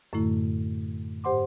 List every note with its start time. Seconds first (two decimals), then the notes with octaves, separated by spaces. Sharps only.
0.13 F#2 A2 D3 A3 E4
1.24 G#2 G4 C5 F#5 C6 D6